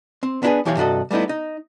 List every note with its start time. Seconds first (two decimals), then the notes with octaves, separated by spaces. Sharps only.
0.23 C4
0.43 B3 D4 E4 F#4 G#4 B4
0.65 B1 E3 G4 C#5 D5 F5
0.77 G2 C3 F#4 A4 D#5
1.11 G3 A3 B3 D#4 E4
1.29 D#4